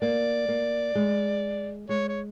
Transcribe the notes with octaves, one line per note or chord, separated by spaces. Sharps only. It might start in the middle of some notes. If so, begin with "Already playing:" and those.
A#3 D5
A#3
G#3
G#3 C#5
C#5